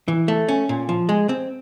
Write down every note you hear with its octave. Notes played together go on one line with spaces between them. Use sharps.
E3
A3
C#4
A#2
F3
G#3
C4